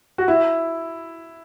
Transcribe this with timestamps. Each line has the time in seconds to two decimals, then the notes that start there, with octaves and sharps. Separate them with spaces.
0.18 F#4
0.28 E4